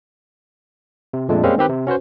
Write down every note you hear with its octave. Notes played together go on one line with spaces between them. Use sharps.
C3
F2 A#2 G#3 A3 D4
G3 G#3 A#3 C4 C#4
D#3 C4 G4 B4
C3
C#4 F#4 B4 C5